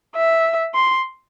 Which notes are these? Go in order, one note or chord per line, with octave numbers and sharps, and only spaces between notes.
E5
C6